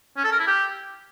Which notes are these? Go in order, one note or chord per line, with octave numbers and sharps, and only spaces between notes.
C#4
A4
A#4
E4
G4